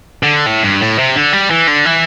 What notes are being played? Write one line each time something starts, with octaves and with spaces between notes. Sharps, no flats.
D3
A2
G2
A2
C3
D3
G3
E3
D3
E3